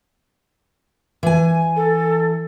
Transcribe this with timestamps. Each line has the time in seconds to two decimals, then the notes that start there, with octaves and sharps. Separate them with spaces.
1.23 E3 G#5
1.76 A4